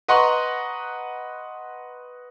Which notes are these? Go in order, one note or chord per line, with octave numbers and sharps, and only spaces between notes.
B4 D#5 F#5 A#5 C6 C#6